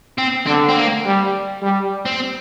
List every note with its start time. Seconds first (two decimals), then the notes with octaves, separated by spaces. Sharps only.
0.18 C4
0.47 D3 C4
0.69 C4
0.77 A#3
1.05 G3
1.62 G3
2.06 C4